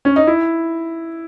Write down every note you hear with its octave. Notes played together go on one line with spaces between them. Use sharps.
C#4
D#4
E4